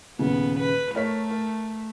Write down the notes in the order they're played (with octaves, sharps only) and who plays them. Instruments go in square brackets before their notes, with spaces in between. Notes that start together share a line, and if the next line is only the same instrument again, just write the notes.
[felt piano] D#1 C#3 [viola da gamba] B3
[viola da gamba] B4
[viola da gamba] A3 [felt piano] A#4 C#5 B6
[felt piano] A#4